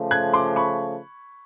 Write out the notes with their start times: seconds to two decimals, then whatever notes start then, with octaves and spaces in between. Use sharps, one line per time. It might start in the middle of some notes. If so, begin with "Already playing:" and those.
Already playing: C#3 F3 A3
0.11 F#6 G#6
0.34 C6 D6
0.56 B5 C#6